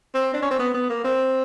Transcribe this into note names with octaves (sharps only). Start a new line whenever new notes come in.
C4
D4
C#4
C4
B3
B3
A#3
C4